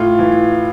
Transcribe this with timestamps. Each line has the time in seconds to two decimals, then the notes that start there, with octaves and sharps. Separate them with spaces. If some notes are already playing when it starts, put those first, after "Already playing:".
Already playing: A2 F4
0.19 E3